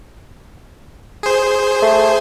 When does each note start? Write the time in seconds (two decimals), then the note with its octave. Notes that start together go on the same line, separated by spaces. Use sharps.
1.23 G#4 C5
1.82 A3